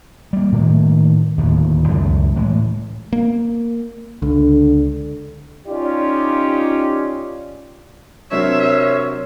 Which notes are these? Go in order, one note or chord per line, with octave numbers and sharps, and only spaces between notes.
G3 A#3
A2 D#3 A3 A#3
D1 D#2 A2
C#2 F#2 A2 G#3
A2 E3 G#3
A#3
C#2 D3
C#4 D#4 F4 G4 D5
C3 F#3 D4 A#4 C5 C#5 E5